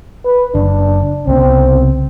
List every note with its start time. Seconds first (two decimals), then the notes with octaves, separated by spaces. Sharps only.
0.25 B4
0.55 F#1 D4
1.27 C2 C#3 B3 C4